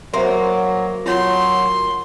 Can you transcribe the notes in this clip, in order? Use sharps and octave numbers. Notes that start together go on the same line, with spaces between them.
F#3 A#3 C5 E5 C6
F#3 F4 C#5 C6